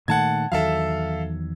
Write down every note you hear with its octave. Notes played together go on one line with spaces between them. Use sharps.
A#2 D#3 A3 F#5 A5 G#6
E2 D#3 F#3 A4 E5 F5